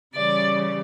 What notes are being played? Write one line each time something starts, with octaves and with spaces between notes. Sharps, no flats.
C#3 E3 G3 D5